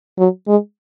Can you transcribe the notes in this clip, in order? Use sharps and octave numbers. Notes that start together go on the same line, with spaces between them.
F#3
G#3